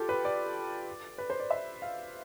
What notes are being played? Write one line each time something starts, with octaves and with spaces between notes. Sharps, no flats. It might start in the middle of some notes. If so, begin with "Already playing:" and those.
Already playing: F4 G4 A4
B4
D5
B4
C5
D5
E5
F5